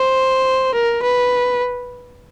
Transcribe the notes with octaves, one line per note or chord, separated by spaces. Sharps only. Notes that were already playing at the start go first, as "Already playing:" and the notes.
Already playing: C5
A#4
B4